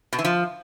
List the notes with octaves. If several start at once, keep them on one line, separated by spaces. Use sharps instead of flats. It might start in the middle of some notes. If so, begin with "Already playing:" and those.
B2
E3
F3